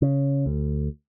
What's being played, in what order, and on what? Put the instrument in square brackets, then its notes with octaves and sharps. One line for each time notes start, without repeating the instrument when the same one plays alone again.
[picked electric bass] C#3
D2